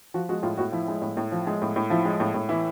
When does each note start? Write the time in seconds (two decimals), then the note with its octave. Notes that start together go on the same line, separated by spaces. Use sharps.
0.14 F3 F#4
0.29 G#3 F#4
0.43 A2 F4
0.57 A2 F#4
0.72 F3 E4
0.88 G#3
1.02 A2
1.17 A2
1.32 F3
1.47 G#3
1.62 A2
1.76 A2
1.90 F3 E4
2.05 G#3
2.20 A2
2.34 A2
2.49 E3 E4